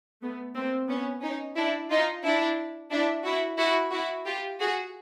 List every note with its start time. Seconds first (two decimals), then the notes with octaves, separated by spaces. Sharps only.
0.22 A3 B3
0.55 A#3 C4
0.89 B3 C#4
1.22 C#4 D#4
1.56 D4 E4
1.90 D#4 F4
2.24 D4 E4
2.91 D4 E4
3.25 E4 F#4
3.58 E4 F#4
3.92 E4 F#4
4.26 F4 G4
4.60 F#4 G#4